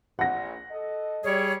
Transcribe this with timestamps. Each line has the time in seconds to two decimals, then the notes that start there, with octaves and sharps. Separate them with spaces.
0.19 A#1 F#5 A#6
0.71 A4 D#5
1.24 G3 G#4 C#5